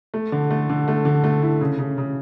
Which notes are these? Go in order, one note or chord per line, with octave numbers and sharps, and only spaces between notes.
A3
D3
A3
D3
A3
D3
A3
E4
C#3
C#3
C#3